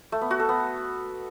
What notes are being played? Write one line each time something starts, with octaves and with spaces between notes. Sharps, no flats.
A3
B3
F#4
A4
B3